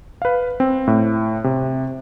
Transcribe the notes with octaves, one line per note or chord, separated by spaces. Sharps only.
B4 F5
C4
A2
C3